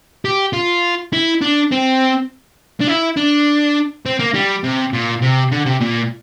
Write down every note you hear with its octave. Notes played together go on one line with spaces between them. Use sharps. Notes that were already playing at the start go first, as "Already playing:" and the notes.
G4
F4
E4
D4
C4
D4
E4
D4
C4
A#3
G3
C3
A#2
C3
D3
C3
A#2